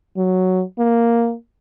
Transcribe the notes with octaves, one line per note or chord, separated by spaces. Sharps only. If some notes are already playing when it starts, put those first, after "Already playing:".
F#3
A#3